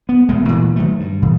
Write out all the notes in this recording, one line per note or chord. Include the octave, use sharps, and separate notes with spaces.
B3
E1 B2 G#3 A3
D2 A#2 E3
D#3 F#3 A3
G2
A#2 E3